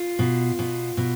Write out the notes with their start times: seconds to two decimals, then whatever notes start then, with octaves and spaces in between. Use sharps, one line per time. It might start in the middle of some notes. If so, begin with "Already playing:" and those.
Already playing: F4
0.19 B2
0.59 B2
0.97 B2